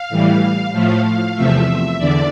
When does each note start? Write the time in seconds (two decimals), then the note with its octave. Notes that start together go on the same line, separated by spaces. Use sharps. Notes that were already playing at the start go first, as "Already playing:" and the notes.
Already playing: F5
0.10 A2 E3 G3
0.72 A2 F3 A3 F5
1.04 F5
1.35 E2 C3 F3 A3 E5
1.98 E2 D3 D5